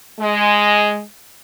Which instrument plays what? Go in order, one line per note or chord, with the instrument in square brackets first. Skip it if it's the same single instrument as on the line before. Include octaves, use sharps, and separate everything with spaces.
[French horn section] G#3